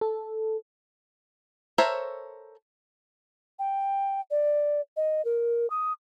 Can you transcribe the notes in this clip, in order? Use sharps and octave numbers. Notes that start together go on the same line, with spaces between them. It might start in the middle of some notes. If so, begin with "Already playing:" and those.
A4
A4 A#4 C5 C#5 E5
G5
D5
D#5
A#4
D#6